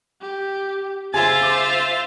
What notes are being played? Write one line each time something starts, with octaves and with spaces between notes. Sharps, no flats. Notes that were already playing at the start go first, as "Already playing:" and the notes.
G4
C#3 F4 C5 E5 G#5 G#6 A6
D6